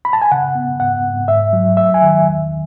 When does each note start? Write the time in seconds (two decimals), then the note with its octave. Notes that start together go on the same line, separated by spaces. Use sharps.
0.05 B5
0.13 A5
0.22 G#5
0.32 C#3 F#5
0.55 B3
0.80 G#2 F#5
1.04 G#2
1.28 G#2 E5
1.53 F#3
1.77 A3 E5
1.94 G#5
2.02 D#3
2.27 E2